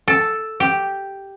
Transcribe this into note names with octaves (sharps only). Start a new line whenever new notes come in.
A4
G4